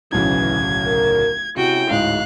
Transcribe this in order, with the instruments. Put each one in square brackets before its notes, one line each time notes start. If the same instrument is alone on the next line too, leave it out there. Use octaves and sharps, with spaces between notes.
[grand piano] D1 B1 C#3 [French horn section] E3 [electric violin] G#6
[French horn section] A#4
[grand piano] C3 [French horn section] G#3 C#4 E4 [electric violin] F#4 G5
[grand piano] D1 G#2 D#5 [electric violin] F5 F#6